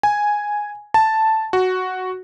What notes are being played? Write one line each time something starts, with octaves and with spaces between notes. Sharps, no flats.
G#5
A5
F#4